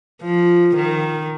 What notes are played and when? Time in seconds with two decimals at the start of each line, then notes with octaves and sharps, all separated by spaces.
0.23 F3
0.76 D#3